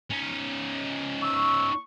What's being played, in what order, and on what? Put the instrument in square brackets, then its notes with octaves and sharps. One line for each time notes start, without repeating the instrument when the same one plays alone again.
[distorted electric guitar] C#4 D#4
[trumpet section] C#6 [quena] E6